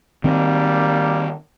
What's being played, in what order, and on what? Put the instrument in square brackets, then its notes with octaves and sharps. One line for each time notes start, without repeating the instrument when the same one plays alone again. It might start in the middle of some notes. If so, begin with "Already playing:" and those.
[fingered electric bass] D#3 C4 [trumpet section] G3 A#3